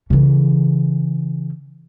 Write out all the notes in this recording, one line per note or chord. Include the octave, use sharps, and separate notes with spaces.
C#3 E3